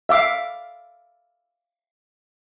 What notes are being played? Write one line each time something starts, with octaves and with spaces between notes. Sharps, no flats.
E5 F5 D6